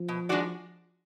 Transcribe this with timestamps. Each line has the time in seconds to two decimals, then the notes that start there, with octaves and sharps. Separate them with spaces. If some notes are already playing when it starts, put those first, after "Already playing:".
Already playing: F3
0.08 B2
0.29 G#3 D4 F#4 D5